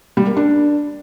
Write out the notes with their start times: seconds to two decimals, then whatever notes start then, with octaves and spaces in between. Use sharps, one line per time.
0.17 G3
0.27 A#3
0.37 D4